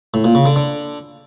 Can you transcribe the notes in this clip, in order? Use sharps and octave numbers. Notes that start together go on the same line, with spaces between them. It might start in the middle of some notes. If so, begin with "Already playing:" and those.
A2
A#2
C#3
D3
D3